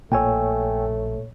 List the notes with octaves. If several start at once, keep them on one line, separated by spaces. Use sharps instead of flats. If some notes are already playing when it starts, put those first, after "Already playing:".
A#1 A#2 A3 A#3 C#5 G5 G#5 E6